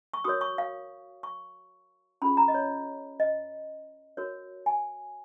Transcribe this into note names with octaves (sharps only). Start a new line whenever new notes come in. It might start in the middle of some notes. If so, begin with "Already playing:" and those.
C#6
F#4 A#4 C#5 D#6
C#6
F5
C#6
C#4 F4 G#4 B5
A#5
D#5
C#5
D#5
F#4 A#4 C#5
G#5